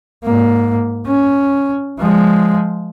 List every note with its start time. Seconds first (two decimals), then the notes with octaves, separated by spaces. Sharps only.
0.24 G#2 A#3
1.07 C#4
1.99 F3 G#3